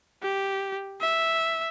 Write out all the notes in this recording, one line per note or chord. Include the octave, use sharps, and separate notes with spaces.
G4
E5